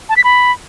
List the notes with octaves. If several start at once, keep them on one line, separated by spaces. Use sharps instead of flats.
A5
B6
B5